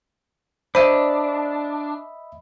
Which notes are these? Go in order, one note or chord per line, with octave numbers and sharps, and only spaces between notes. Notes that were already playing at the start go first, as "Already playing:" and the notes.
D4 C5 D#5 E5 B5 D#7